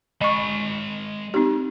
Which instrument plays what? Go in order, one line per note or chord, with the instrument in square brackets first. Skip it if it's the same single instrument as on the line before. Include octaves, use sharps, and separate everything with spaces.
[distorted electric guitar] G#3 B5 [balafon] D#5 C#6
[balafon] C4 D#4 G4